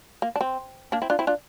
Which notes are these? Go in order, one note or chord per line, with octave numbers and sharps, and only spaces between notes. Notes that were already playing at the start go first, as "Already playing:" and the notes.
A#3
D4
C4
A#3 D4
C4 E4
D4 F4
C4 E4
D4 F4